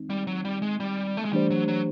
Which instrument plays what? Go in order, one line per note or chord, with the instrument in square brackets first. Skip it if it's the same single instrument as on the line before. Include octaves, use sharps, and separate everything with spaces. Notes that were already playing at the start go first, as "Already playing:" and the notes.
Already playing: [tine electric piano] D#3 G#3 C4 D#4
[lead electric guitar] G3
F#3
G3
G#3
G3
A3
G#3
[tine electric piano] E3 A3 D4 G4 C5 [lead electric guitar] G3
[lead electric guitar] F#3
F#3